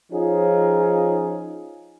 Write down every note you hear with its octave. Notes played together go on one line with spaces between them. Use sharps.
F3 C#4 D#4 F4 G#4